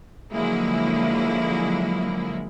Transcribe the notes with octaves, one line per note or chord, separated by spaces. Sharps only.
D3 F3 F#3 G#3 A#3 E4